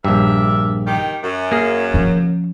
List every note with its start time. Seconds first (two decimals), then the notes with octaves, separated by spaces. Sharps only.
0.05 A#1 G2 A#4 D5 E5
0.86 D#3 G4
1.24 F#2
1.51 A#3 G#4
1.94 F3 C#4